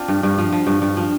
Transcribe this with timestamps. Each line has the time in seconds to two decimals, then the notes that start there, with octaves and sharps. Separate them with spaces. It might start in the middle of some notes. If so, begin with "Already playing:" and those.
Already playing: C4 D4 F4
0.08 G2
0.23 G2
0.38 F3
0.52 F3
0.67 G2
0.82 G2
0.97 F3